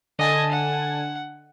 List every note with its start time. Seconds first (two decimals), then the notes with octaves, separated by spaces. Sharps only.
0.19 D3 D#5 G#5 A5
0.52 F#5